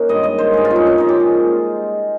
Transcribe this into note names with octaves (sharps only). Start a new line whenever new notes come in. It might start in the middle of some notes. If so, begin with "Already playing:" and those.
Already playing: A#3 C#4 D#4
G2 D#3 G#3 D#5
D#5
C5
G2 D#3 G#3 G#4
F4
C#4
D#4
C#4
A#2 F3 G#3 D#4
G4
G#4